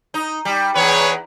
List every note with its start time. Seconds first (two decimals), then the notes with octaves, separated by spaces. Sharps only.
0.14 D#4
0.45 G3
0.75 E2 G#4 B4 C#5